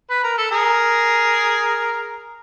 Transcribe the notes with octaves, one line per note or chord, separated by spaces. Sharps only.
B4
A#4
A4
G#4 A#4